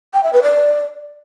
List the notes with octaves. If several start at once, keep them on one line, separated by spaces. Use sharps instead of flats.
G5
E5
B4
D5